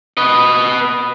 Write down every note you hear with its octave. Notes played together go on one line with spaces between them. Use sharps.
B4 D#5